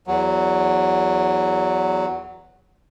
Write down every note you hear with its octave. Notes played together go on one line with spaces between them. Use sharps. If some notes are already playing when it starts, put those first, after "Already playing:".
E2 F#3